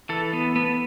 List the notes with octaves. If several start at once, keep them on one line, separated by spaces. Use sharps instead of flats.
E3 A4
B3
B3